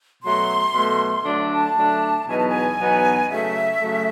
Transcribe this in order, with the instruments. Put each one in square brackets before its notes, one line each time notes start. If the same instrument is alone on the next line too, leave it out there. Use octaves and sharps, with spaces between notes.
[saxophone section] B2 F#3 A3 [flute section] C6
[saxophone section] B2 F#3 A3
D3 F#3 A3 D4
[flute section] A5
[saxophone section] D3 F#3 A3 D4
[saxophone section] E2 B2 F#3 B3 D#4 [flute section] G#5
[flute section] A5
G#5
[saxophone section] E2 B2 F#3 B3 D#4
[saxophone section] C#3 F#3 A3 [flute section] E5
[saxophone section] C#3 F#3 A3